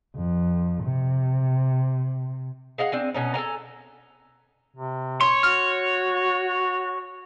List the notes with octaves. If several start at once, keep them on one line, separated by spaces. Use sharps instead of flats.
F2
C3
G#4 D#5 F5 F#5
C4 D4 G#5
B2 C#4 D#4
A4 A#4 G#5 A#5
C3
C#5 C6
F#4 F6